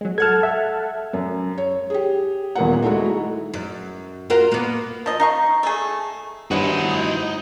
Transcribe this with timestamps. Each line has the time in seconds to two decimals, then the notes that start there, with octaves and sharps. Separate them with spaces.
0.01 F#3 G#3
0.18 A4 F#5 A5 F6 G#6
0.43 E5
1.13 F#2
1.58 C#5
1.90 G4 G#4
2.55 D#1 A#2 B3 F#5
2.82 G#3 A3 D#4 E4 F#4
3.54 F#2
4.30 F4 F#4 A#4
4.51 A#3 B3
5.06 F3 D#5
5.20 D#4 F5 C#6
5.63 A3 G#4
6.51 G2 E3 F#3 B3 D#4 F#4 C5